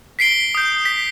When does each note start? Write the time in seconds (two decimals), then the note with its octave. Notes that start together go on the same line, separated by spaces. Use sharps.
0.19 B6 C7 D7 G7
0.55 D#6 G6
0.85 B6